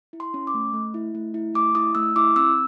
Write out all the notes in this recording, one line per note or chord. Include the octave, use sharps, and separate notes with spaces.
E4
C6
C#4
D6
A3
A3
E4
A3
E4
A3 D6
E4 D#6
A3 E6
E4 D6
C4 E6